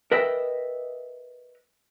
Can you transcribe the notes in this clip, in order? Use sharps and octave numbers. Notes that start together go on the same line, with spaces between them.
A#4 B4 D#5 E5 G5